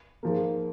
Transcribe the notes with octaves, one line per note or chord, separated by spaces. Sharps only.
G#2 F3 A#3